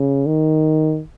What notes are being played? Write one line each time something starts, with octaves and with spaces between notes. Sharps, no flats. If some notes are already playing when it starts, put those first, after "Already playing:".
Already playing: C#3
D#3